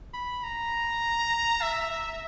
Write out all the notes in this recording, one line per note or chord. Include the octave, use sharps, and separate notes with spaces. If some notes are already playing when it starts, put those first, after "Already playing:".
B5
A#5
E5
E5